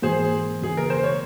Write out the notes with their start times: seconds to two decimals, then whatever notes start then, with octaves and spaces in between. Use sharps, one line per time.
0.02 G#2 E3 A#3 G#4 C5
0.60 E2 C#3 E3 A#3 G#4
0.77 A#4
0.90 C5
1.04 C#5